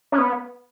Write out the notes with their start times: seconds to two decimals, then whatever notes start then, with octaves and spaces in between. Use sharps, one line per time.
0.12 C#4
0.18 B3